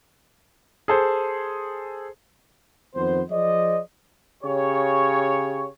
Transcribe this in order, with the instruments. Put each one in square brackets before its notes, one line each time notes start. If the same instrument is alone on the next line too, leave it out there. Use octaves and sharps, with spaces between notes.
[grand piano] G#4 A4 C5
[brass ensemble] F2 D#3 B3 C5
F3 G#4 C5 D5 D#5
[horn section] C#3 G4 C#5